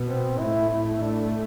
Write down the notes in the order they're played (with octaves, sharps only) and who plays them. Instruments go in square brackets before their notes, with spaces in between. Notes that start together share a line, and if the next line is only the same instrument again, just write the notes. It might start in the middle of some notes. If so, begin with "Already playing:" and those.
Already playing: [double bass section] B2 B3
[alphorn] C4
[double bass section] A2 A3 [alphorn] E4
[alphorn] E4
D4